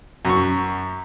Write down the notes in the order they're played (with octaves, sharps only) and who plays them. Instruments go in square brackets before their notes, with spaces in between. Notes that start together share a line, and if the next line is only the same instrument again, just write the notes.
[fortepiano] F#2 C#6